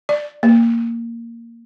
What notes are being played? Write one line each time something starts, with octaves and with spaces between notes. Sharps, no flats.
D5
A#3